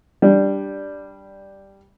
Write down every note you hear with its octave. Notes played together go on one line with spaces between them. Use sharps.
G3 D4